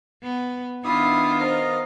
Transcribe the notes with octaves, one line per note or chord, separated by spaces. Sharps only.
B3
D#3 B3 D4 E4 F4 E5 D#6
A#4 C5 D#5